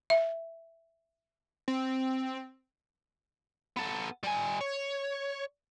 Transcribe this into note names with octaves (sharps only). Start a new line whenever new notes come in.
E5
C4
B3 A4
G3 G#5
C#5